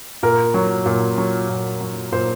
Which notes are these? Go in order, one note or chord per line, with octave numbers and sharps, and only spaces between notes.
A#2 A#4
F#3
A#2
F#3
A#2
F#3
A#2 C5